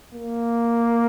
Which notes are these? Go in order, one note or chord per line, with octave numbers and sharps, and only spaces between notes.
A#3